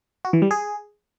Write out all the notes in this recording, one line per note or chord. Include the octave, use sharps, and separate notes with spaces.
F#4
E3
G3
G#4